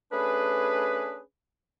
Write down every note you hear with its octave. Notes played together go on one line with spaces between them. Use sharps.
A3 C#4 D4 G#4 B4